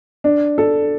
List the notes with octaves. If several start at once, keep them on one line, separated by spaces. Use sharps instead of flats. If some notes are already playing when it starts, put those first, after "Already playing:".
D4
A4